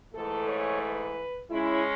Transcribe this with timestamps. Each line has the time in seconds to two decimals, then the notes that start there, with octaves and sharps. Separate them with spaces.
0.13 G#2 E3 A3 A4
0.48 C#5
0.81 B4
1.50 C#3 G#3 C#4 E4